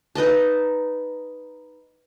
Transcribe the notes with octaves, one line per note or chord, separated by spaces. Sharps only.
D#4 B4 D#5 A5